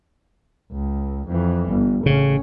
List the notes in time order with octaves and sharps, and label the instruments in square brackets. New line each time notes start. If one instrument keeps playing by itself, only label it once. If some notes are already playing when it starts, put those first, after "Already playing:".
[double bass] C#2
F2 E3
G1
[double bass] A1 C#4 [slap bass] C#3